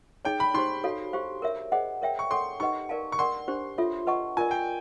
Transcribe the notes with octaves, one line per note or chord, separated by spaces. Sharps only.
D#4 G#4 C#5 G5
B5
D#4 G4 C5 C6
F#4 A4 C#5 F5
G4 C5 F5
A#4 C#5 E5
G#4 C5 D#5 F#5
A#4 C#5 E5 G5
C#6
A4 C#5 F#5 C6
D#4 G4 B4 D#5 F#5 C#6
A#4 D5 F5 A5
C#6
A#4 D5 F#5 C6
D4 G4 C5
F4 A4 C#5 E5
B4 D#5 F#5 A5 C#6
F4 A#4 D5 G#5
G5